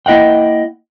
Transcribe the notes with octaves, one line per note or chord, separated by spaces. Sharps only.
A#3 E4 D#5 F#5 G5